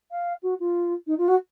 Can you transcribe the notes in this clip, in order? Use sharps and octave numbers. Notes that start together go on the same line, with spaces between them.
F5
F#4
F4
D#4
F4
F#4